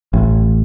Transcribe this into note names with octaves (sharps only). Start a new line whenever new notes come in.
A1